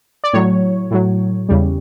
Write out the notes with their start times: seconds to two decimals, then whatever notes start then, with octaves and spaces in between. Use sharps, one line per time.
0.24 D5
0.33 A2 F#3 C#5
0.91 A2 F#3
1.49 E2 C#3 G3